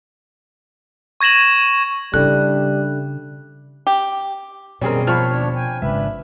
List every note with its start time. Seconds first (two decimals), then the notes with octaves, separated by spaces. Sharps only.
1.20 C#6 G#6 A#6 E7 F#7
2.14 C#3 G3 D4 E4 A4 F#6
3.87 G4
4.81 F#2 B2 D#3 G3 C4 C#4 G#4 A#4
5.07 F3 C#5 B5 C#6 F6
5.29 D#2 D4 C#5
5.55 G5 G#5
5.82 G#1 C#3 G#3 D4 B4 E5